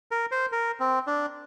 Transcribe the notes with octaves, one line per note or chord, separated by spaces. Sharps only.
A#4
C5
A#4
C4
D4